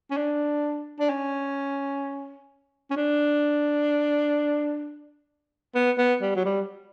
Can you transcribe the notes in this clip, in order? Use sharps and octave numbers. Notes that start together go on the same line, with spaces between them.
C#4
D4
D4
C#4
C#4
D4
B3
B3
G3
F#3
G3